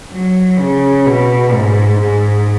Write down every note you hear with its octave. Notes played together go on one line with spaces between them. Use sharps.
F#3
C#3
B2
G#2
G#2